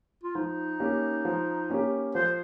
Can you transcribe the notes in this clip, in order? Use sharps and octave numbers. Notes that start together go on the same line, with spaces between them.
F4
F3 D#4
A#3 C#4 G4
F3
A#3 C#4 G4
F3 C5